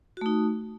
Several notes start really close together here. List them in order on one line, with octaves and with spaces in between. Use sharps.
F#4 A3 D#4